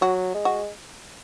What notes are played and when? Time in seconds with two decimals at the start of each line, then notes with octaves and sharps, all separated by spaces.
0.01 F#3 F#4
0.34 G#3
0.45 F#4